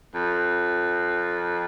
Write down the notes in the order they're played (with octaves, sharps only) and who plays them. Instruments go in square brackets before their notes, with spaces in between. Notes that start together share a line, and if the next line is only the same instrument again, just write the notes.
[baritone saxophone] F2